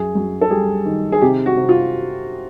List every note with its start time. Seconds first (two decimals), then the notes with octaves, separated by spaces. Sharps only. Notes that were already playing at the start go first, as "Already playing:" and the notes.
Already playing: F#2 G#4
0.15 F#2
0.41 A4
0.50 G3 G#4
0.85 D#3
1.12 G#4
1.21 C3 G4
1.46 F#4
1.57 C3
1.69 F4